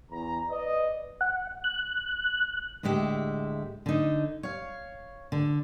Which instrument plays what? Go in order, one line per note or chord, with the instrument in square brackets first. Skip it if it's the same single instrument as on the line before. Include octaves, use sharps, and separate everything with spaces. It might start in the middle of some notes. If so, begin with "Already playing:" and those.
[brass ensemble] E2 A#5
B4 D5 D#5
[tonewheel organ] F#5
F#6
[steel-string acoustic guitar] D2 A2 G#3 G4 E5
D3 D#4
C#5 F5
D3